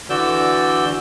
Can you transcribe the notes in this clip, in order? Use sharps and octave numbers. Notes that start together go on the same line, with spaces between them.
D3 E3 F#4 D5 E6 G6